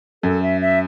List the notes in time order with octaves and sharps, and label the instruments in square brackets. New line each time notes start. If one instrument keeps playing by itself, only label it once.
[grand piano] F#2 [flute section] A4
[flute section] E5
E5